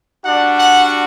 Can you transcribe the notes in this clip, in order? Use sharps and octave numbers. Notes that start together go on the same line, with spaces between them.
G3 D4 F#4 F#5
F#5